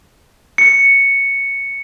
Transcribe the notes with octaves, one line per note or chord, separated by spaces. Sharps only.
C#7